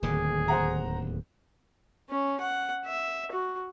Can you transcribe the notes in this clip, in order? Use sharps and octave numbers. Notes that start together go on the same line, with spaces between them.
D1 D#2 D3 D#3 G#4
C5 F#5 A#5
C#4
F#5
E5
F#4